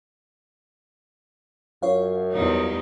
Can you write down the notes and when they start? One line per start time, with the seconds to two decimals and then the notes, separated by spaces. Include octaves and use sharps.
1.82 F#2 F4 C#5 F5
2.32 E2 G3 D#4